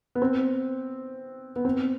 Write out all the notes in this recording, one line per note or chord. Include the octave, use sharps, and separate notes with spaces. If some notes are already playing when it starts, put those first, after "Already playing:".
B3
C4
B3
C4